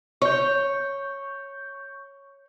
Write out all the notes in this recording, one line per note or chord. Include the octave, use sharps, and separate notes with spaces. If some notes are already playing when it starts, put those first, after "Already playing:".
C#5 C#6 G6